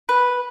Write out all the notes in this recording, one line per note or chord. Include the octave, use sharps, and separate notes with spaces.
B4